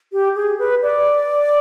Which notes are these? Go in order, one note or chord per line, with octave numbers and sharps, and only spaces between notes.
G4
G#4
B4
D5